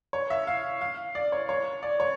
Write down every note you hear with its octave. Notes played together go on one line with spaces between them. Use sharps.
C#5
E5
F5
F5
D5
C#5
C#5
D5
C#5